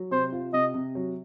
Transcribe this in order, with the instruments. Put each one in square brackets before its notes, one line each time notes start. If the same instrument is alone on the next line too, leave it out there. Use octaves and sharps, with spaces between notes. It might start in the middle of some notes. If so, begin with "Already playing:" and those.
Already playing: [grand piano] F#3
[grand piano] C3 [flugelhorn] C5
[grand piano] F4
[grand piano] C3 [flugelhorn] D#5
[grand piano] C3
F#3